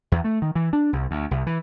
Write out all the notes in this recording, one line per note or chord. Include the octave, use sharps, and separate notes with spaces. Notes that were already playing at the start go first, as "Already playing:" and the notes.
E2
A3
D#3
E3
D4
C2
D2
C2
E3